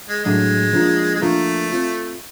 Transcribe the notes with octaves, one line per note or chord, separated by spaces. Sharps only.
G#3
A2 F#3 G#3 A3 D4
F3 A#3 D4 F4 A#4
G#3
F3 A3 A#3 D4 F4 A#4
C4 F4 A4